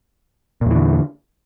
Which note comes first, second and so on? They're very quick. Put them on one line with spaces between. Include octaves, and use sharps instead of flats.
A#2 E2 E3 D3